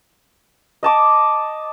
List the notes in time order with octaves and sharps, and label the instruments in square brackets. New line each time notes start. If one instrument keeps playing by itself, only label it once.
[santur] D#5 A5 D6 D#6